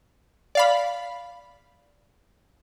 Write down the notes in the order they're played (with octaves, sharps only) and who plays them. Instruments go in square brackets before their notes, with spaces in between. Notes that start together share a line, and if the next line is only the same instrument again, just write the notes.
[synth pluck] D5 F5 B5